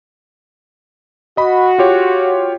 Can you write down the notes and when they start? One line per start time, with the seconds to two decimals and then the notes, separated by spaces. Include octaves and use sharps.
1.37 F#4 D#5 B5
1.78 F4 G4 C#5